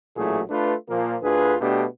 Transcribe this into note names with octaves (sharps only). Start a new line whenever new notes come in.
A1 A#2 F#3 A3 E4 G#4
A3 D4 F4 B4
A#2 F3 A#3
D2 D3 F4 G#4 B4
B2 A3 B3 D4 G4